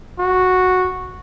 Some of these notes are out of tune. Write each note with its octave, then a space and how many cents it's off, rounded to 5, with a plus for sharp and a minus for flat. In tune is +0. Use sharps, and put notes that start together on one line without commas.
F#4 -5